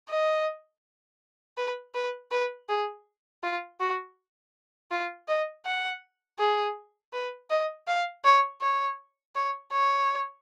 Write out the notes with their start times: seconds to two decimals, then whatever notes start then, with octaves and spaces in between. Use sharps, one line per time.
0.09 D#5
1.58 B4
1.95 B4
2.31 B4
2.69 G#4
3.43 F4
3.80 F#4
4.91 F4
5.28 D#5
5.65 F#5
6.39 G#4
7.13 B4
7.50 D#5
7.87 F5
8.24 C#5
8.61 C#5
9.35 C#5
9.72 C#5